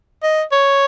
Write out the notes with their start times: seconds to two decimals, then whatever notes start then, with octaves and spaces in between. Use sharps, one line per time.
0.23 D#5
0.52 C#5